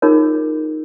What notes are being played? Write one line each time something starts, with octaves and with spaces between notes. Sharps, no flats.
D#4 F4 G#4 A#4 C#5